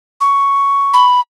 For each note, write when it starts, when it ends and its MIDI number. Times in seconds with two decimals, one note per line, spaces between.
0.21 1.06 85
0.94 1.20 83